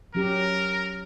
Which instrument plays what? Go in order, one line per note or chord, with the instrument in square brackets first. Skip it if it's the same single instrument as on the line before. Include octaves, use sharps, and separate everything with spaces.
[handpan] F#3 C#4 G4 [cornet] A#4